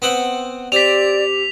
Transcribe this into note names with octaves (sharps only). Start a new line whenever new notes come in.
B3 C4 F#5
C4 G4 D5 B6 F7